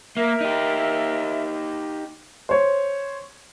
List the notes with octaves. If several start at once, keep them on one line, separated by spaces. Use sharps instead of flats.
A#3 A#4 E5
D#4 G4
C5 C#5